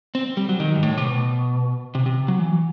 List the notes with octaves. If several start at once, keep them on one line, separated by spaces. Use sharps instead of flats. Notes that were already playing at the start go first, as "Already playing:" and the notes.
C4
G3
F#3
D#3
G2
A2
C3
B2
C3
C3
F#3
E3